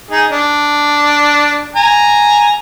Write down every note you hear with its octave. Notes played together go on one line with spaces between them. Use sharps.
D#4 G#4
D4
G#5 A#5